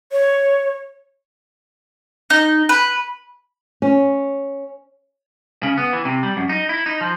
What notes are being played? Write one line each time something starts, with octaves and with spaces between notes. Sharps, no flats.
C#5
D#4
B4
C#4
C#3
B3
E3
C3
G3
F#2
D#4
E4
D#4
F3